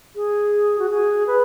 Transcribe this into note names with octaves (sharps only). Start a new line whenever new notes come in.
G#4
F#4
G#4
B4